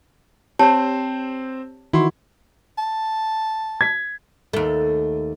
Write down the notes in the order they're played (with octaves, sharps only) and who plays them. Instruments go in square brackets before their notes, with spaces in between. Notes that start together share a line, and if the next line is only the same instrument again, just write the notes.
[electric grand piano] C4 C5 [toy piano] G4 C#5 A5
[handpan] D#3 E3 F#4 [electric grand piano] E4 C6
[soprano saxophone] A5
[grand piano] G#6 B6
[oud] D#2 A3